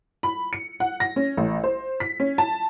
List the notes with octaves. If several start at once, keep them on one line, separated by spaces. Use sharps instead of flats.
B5
C#7
F#5
A#6
C#4
A1
C5
B6
C#4
A5